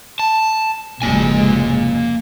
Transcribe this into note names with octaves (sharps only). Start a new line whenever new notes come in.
A5
F1 C#2 G#3 A#3 G#5